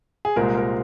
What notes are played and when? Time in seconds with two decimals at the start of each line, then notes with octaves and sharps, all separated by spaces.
0.25 G#4
0.36 C2 A#2 G#3 C4 A#4
0.57 A#4